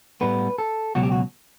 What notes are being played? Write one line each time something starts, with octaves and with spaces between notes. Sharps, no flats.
A2 G3 B3 B4
A4
C#2 B2 F#3 F#4
G4
F#4